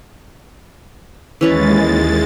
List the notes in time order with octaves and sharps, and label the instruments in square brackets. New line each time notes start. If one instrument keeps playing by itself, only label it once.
[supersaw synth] D#2 G#3 A6 [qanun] E3 C#4 B4